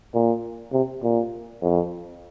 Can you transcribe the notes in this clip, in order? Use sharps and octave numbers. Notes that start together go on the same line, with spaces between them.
A#2
C3
A#2
F2